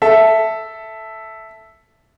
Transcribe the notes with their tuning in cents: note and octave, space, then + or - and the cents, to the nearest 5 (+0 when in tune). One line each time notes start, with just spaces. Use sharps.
A4 +0 E5 +0